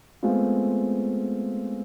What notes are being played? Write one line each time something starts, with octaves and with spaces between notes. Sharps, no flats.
G#3 A3 B3 C4 F4